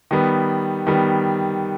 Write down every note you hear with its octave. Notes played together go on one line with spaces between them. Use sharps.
D#3 G3 B3
D#3 G3 B3